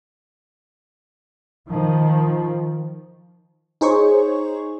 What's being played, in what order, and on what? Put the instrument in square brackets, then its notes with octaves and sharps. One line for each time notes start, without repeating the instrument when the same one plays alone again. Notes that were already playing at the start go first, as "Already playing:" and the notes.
[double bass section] D#3 F3
[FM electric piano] D#4 G#4 C5 C#5 C#6